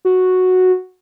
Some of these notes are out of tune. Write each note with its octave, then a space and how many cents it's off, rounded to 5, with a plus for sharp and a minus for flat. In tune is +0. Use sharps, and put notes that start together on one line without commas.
F#4 -5